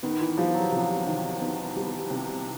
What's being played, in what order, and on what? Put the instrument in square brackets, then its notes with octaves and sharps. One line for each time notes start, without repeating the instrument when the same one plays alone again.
[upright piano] D#3 [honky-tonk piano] B3
[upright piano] E3
[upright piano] F3 [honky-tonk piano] G3
[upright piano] F#3
[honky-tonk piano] C3 [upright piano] F3
[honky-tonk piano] D#3
B3
G3
C3